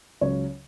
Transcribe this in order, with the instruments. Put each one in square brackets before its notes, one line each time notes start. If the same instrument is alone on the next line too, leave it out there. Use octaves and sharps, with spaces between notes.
[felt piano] C#2 C#3 F#3 C#5